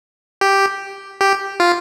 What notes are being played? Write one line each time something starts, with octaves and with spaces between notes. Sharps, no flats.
G4
G4
F4